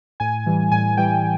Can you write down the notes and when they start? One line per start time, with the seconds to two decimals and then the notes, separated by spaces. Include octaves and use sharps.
0.20 A2 G#5
0.47 E3 G3
0.72 A2 G#5
0.97 E3 G3 G5